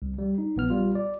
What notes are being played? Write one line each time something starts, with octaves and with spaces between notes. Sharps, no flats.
C2
G3
D#4
A#1 B3 F6
G3 F4
D5